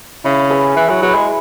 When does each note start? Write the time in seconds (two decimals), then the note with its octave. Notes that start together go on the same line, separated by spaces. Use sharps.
0.24 C#3 E4
0.50 G#4 B4 E5
0.76 E3 E4
0.89 F#3
1.02 F#3 G#4 B4 E5
1.15 G#3